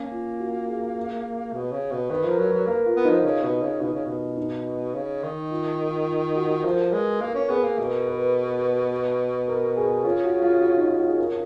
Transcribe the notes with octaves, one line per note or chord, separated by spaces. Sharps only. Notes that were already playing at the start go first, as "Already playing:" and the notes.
Already playing: A#3 C#4
F4
F#4
G#4
B2
C#3
B2
D#3 B4
F3 A#4
F#3
B4
F#3
A#3 A#4
F4
B3
F3 D#4
C#3
B2
C#3
B2 D#4
C#3
B2
D#4
C#3
D#3
F4
F4
F4
F#4
F3 A#4
A#4
G#3 B4
A#3 A#4
C#4
B3 G#4
A#3
B2 A#4
B4
A#4
G#4
C#3 F4
F#4
F4
F#4
D#4
F4
F#4
G#4
A#4